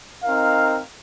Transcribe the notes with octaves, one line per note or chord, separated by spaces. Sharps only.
C4 D#4 A#4 F5